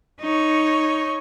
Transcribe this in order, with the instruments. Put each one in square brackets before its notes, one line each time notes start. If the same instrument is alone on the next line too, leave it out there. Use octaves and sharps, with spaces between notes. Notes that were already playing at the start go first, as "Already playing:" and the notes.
[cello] D#4 C#5